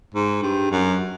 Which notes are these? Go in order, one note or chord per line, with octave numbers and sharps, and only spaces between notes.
G#2
G2
F#2